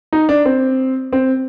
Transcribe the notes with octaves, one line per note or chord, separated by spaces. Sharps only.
D#4
D4
C4
C4